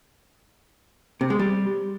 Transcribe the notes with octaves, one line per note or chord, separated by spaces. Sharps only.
C3
G#3
G3